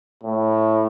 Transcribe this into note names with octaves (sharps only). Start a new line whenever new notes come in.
A2